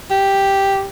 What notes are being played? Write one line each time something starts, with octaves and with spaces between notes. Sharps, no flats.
G4